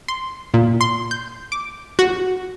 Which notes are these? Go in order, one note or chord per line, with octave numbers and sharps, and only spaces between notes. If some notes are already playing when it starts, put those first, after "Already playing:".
C6
A#2
C6
G6
D6
F#4